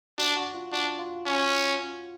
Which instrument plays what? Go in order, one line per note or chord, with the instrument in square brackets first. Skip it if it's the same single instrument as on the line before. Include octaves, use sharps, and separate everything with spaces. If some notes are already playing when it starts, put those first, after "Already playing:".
[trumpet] D4 [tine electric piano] F#4
[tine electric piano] F#4
F4
[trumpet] D4 [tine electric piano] F#4
[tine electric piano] F4
[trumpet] C#4